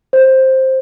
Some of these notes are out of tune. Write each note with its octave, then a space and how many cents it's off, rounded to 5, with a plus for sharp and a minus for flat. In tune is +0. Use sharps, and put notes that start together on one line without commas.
C5 +10